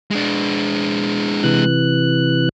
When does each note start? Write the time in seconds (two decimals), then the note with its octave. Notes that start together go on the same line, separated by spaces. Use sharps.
0.11 G#3 D4
1.44 C3 E3 F#6